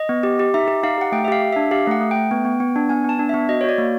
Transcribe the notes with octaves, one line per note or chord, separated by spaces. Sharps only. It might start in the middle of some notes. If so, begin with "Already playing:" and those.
Already playing: D#5
B3
G4
G4
D#4 E5
G4
D#4 F5
G4 F#5
A3 G5
E5
G4 F5
G4
D4 E5
G4 F5
A3 F#5
A3
A3 G5
B3
B3
B3
D4
B3 G#5
B3 A5
D4
B3 E5
F#4 D#5
C#5
F#4 D5
A#3